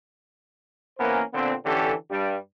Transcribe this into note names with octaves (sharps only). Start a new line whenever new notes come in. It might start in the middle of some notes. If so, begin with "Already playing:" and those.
E3 A#3 B3 C#4 A#4 C5
A#2 D3 B3 C4
D3 E3 C#4 G4 A4
G2 G3